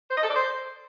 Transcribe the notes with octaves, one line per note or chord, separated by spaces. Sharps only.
C5
D#5
A4
D5
C5